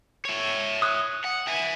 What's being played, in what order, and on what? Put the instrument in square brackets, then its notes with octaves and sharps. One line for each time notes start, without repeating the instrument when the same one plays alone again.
[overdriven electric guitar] C#5 E5
[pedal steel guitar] D#6 F#6
[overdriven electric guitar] F#5
E5 G#5